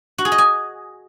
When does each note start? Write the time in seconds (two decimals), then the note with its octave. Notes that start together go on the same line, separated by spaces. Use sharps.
0.18 F#4
0.25 G#4
0.32 D#5
0.38 G#5